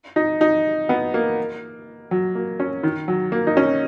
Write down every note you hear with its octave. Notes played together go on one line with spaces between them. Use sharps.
D#4
D#4
B3
A#3
F#3
A#3
C#4
D#3
F#3
A#3
D#4
C#4